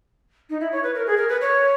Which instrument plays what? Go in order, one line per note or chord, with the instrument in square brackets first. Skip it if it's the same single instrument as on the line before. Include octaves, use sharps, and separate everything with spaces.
[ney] D#4
E4
C#5
B4
A#4
G#4
A#4
B4
C#5